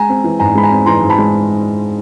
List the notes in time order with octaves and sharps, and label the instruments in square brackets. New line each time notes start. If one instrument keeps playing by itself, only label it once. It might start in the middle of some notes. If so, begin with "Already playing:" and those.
Already playing: [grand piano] G#3 G#5 A#5
C4
E3
G#2 G#5 A#5
G#3 B5
G#5 A#5
C4
E3 A#5 C6
G#2
A5 B5
G#3